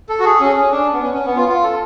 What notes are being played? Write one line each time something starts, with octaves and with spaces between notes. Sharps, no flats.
A4
F#4
G#4
C#4
C#4
D4
B3
C#4
C#4
B3
F4
F4
A4